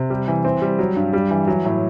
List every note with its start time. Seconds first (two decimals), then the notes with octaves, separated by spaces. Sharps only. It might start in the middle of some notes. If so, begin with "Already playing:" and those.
Already playing: C3
0.10 G3
0.28 E3
0.45 C4
0.62 G3
0.79 F#3
0.96 G2
1.13 G3
1.31 E3
1.47 F#3
1.65 A2